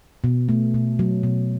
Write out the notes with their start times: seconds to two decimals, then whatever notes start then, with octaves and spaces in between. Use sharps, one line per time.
0.24 B2
0.49 A3
0.74 B2
0.99 F#3
1.23 B2